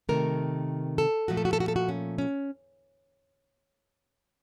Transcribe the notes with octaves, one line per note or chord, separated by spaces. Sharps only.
C3 D#3 A3 A#4
A4
A#2 F3 A3 F#4
A4
F#4
A4
F#4
A4
F#4
C#4
C#4